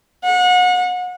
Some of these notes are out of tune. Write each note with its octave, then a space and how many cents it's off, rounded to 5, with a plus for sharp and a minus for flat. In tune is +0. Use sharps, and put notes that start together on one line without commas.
F#5 -35